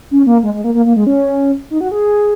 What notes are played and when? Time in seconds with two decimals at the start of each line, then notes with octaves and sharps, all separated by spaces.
0.11 C#4
0.27 A#3
0.43 G#3
0.54 G#3
0.64 A#3
0.74 A#3
0.86 A#3
0.96 G#3
1.07 C#4
1.71 D#4
1.81 F#4
1.91 G#4